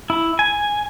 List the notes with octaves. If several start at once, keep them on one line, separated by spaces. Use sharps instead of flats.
E4
G#5